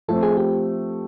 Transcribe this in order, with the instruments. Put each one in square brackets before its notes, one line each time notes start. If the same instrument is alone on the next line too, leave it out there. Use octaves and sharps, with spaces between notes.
[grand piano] F3 A3 C4 [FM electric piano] A4
[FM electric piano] G#4
G4